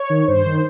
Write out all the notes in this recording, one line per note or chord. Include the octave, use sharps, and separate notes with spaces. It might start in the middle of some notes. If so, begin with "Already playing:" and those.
Already playing: C#5
D#3
G2 C5
D#3